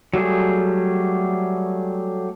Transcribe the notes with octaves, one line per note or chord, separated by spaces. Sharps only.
F#3 G3 A3 G#4